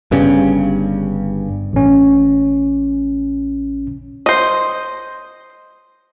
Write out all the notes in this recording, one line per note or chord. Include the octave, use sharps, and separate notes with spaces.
G1 G2 C#3 C#4
A1 C#4
C5 D#5